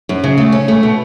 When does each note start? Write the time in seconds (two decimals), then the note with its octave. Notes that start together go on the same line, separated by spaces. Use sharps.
0.09 F#2
0.24 C#3
0.38 A3
0.52 C#4
0.68 A3
0.83 B2